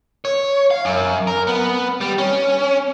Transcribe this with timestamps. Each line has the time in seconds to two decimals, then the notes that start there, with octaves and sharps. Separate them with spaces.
0.25 C#5
0.71 F5
0.85 F#2
1.27 A#4
1.47 B3
2.01 G3
2.18 C#4